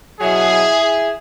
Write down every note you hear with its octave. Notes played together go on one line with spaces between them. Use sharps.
B2 F#3 E4 G#4